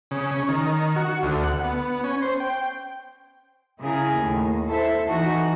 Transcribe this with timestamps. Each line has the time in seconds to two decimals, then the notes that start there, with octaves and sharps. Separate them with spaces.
0.11 C#3
0.31 C#4
0.48 D#3
0.96 F#4
1.23 D2
1.44 F#5
1.64 B3
2.04 C#4
2.22 C5
2.40 G5
3.79 C#3 E4 G#4 A#4
4.15 D#2 A2
4.68 E4 A4 C5 E5
5.06 E3 D#4 F#4